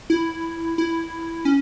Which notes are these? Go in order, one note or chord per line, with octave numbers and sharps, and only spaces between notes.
E4
E4
C#4